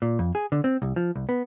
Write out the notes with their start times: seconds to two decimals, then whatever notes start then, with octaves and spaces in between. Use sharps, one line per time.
0.02 A#2
0.19 F2
0.35 G#4
0.52 D3
0.64 C4
0.82 C2
0.96 F3
1.16 C2
1.29 B3